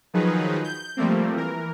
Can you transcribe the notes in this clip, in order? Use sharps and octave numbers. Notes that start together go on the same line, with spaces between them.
D#3 F3 F#3 D#4 G#4 B4
G6
F3 G3 A3 A#3 C4
E3 A#4